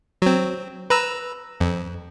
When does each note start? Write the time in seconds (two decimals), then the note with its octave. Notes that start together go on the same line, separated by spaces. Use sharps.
0.22 F#3 C4
0.90 B4 A#5 E6
1.60 F2